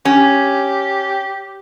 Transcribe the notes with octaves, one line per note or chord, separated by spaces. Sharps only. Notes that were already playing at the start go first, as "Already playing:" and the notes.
C#4 G4